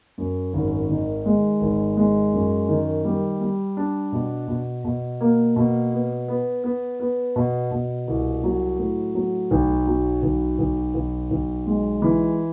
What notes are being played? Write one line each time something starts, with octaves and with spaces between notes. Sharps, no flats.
F#2
G#1
D#3
G#3
G#1
G#3
F#2
D#3
G3
G3
D4
B2
B2
B2
A#3
B2
B3
B3
B3
B3
B2
B2
C2
F#3
A2
F#3
B1
F#3
B1
B1
B1
B1
G#3
E3